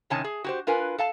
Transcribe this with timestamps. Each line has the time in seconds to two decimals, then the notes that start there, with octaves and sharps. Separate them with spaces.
0.10 A2 C3 D#3 C#4 D#4 A5
0.24 G#4
0.44 F#4 G4 C5
0.67 D4 F4 A#4 B4 G#5
0.98 A4 F5 A5